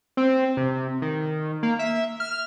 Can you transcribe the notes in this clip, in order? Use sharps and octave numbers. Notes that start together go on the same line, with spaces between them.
C4
C3
D#3
A#3
E5
F6